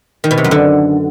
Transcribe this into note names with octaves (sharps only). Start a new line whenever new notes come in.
D#3
B2
C3
F#2
D3